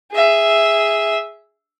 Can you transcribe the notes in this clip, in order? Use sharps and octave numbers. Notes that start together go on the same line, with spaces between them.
G#4 E5